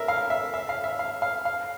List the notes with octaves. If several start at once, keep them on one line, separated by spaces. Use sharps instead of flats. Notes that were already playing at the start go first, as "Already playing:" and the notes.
Already playing: A#4 E5
F5
E5
E5
F5
E5
F5
F5
F5